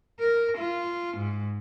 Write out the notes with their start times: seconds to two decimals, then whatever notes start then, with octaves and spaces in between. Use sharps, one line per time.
0.19 A#4
0.57 F4
1.16 G#2